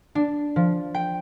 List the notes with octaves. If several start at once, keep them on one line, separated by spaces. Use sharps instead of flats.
D4
F3
G5